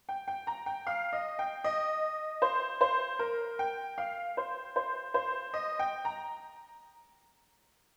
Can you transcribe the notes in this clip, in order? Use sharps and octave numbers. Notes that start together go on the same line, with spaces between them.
G5
G5
A#5
G5
F5
D#5
G5
D#5
C5
C5
A#4
G5
F5
C5
C5
C5
D#5
G5
A#5